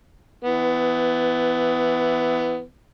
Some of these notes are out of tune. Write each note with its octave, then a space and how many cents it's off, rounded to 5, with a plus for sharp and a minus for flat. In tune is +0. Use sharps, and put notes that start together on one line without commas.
E3 +0 B3 +20